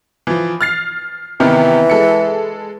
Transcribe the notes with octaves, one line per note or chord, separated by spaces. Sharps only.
E3 F3
F6 A6 C7
C3 D#3 E3 B3
G#3 A4 C#7